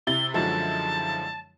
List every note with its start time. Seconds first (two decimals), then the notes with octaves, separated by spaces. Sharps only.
0.07 C3 E4 A6 G7
0.34 F#2 D3 F3 G#3 E4 F#4 A5